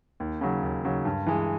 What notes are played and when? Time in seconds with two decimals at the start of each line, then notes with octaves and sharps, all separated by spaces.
0.20 D#2
0.41 C#3 F#3
0.63 D#2
0.84 C#3 F#3
1.05 G2
1.26 E3 G#3